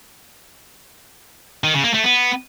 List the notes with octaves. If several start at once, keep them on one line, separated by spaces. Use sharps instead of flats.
D#3
C#3
A#3
A3
B3